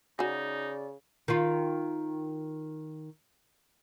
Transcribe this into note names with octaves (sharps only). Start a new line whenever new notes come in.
C#3 D#4 F#4 G#4 D5
D#3 F4